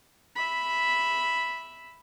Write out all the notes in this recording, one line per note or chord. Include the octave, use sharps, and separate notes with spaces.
E5 B5